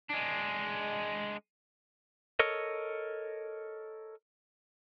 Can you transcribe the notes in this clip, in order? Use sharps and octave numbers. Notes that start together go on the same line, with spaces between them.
G#3 D4
A4 A#4 C#5 D#5